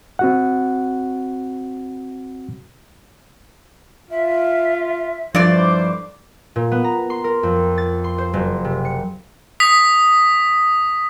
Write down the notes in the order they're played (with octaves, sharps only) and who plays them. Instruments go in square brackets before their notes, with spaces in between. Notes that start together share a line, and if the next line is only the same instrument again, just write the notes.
[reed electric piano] C4 F#4 F#5
[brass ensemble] F4 [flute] E5
[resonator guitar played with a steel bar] G2 D5 [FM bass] F3 [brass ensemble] E4 A4 C5 [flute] D6
[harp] A#2
B3
A#5
C6
A#4
F2
A6
C6
C5
F#1
C3
C#7
[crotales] D#6 B6